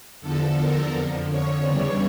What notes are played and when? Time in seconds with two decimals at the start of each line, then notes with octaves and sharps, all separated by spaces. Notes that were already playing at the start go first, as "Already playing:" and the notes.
0.21 E2 D3 F3 A4
0.57 A#4
0.92 F2 D3 F3
1.28 C#5
1.65 E2 C#3 E3 G3 D4 C#5